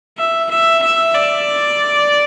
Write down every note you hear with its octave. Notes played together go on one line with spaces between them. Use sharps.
E5
E5
E5
D5